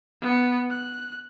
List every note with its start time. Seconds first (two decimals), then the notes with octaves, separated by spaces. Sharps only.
0.22 B3 C#7
0.70 F#6